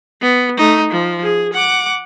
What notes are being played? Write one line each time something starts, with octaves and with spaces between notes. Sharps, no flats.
B3
A3 D#4
F3
G#4
F#5 D6